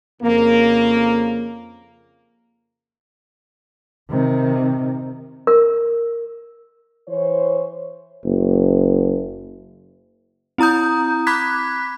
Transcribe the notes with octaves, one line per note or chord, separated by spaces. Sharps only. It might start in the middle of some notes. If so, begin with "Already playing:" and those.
F2 C#3 A#3
C3 D#3
A#4
E3 C5 C#5
F#1
C4 E4 A#5 D#6 G6
B5 D6 F#6 G#6 B6